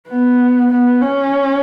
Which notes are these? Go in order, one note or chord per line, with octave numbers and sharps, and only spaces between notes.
B3
B3
C#4